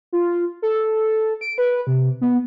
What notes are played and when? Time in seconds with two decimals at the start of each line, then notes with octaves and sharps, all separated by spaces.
0.13 F4
0.62 A4
1.41 D7
1.58 B4
1.87 C3
2.21 B3